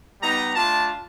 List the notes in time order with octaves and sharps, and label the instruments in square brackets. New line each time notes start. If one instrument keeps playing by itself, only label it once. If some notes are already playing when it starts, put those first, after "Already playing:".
[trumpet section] G3 B3 D#4 A#5
A3 D4 F4 A5